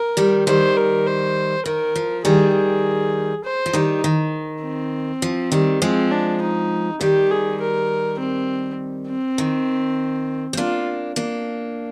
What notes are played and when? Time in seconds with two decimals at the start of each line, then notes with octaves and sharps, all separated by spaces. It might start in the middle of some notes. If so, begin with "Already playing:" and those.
Already playing: A#4
0.17 D#3 G3
0.47 D#3 G3 C5
0.77 A#4
1.06 C5
1.66 D#3 A#4
1.95 F3
2.25 D#3 G3 G#4
2.54 G#4
3.44 C5
3.66 F3
3.73 D#3 G3 D#4
4.04 D#3
4.63 C4
5.22 F3
5.52 D#3 G3
5.81 F3 G#3 C4
6.11 D4
6.41 D#4
7.01 D#3 G3 G4
7.30 G#4
7.60 A#4
8.19 C4
9.08 C4
9.38 D#3
10.53 C4
10.57 A#3 D4 F4
11.16 A#3 D4